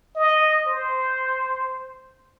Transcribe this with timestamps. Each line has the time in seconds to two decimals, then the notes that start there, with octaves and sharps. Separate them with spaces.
0.16 D#5
0.67 C5